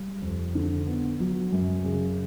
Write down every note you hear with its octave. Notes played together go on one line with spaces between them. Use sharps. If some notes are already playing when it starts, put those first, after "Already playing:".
Already playing: G3
F2
D3
B3
F#3
F#2
C#3